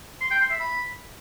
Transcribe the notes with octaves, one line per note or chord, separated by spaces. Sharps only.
C6
G5
C6
E5
B5